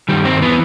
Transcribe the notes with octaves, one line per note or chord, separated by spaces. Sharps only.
G2 D#3 G3
C4
E3 B3